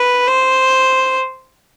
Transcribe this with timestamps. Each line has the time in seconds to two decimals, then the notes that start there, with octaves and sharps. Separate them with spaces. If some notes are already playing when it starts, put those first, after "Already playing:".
Already playing: B4
0.27 C5